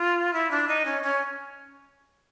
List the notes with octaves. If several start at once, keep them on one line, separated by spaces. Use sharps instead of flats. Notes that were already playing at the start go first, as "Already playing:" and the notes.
Already playing: F4
E4
D4
D#4
C#4
C#4